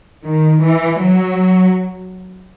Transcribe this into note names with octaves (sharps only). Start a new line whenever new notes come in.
D#3
E3
F#3